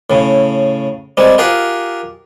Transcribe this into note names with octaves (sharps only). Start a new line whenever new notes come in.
A2 C#3
G3 G#3 C4
F4 G4 G#4 A#4 F#5